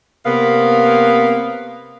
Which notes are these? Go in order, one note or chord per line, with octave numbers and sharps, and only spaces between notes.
C3 A#3 B3 F5